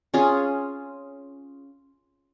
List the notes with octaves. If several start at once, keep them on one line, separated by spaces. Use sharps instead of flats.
C#4 F4 G#4